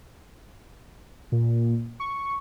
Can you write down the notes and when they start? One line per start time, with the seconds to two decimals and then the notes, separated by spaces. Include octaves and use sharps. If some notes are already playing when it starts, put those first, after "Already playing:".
1.32 A#2
2.00 C#6